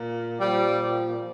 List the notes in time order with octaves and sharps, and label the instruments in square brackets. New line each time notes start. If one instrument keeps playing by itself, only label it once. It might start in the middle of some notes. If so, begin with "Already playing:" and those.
Already playing: [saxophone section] A#2
A#2 F3 G3